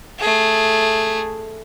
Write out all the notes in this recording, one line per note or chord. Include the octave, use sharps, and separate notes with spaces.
A3 G#4